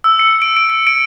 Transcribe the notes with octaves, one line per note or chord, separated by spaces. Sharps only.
E6
C#7
D7
D7
D7
D7